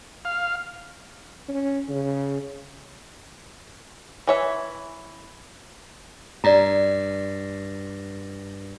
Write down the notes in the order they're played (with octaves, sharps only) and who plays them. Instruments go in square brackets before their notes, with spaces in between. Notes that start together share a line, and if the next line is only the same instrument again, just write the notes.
[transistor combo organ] F5
[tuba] C#4
C#3
[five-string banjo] E3 C#5 E5
[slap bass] G2 [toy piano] D5 A#5